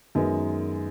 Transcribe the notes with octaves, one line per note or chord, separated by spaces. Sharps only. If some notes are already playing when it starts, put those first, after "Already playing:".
F#2 D#3 G#3 B3